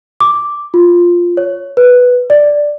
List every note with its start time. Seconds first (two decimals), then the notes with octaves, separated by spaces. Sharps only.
0.20 D6
0.74 F4
1.37 C#5
1.77 B4
2.30 D5